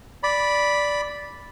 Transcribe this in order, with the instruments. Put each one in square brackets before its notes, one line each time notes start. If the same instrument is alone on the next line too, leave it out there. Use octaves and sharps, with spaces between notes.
[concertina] D5 B5